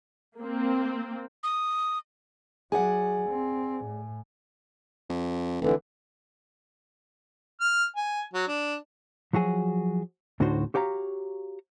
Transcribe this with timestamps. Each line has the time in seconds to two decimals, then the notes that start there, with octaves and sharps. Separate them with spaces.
0.39 A#3 C4
1.43 D#6
2.72 F#3 G#4 D5 F#5 G#5
3.29 C4
3.84 A2
5.10 F2
5.61 F1 D3 E3
7.60 F6
7.96 G#5
8.34 F#3
8.48 D4
9.33 F3 F#3 F#4 G#4
10.40 D2 A2 D4 D#4 F#4 C5
10.74 F#4 G4 C#5 F5 A#5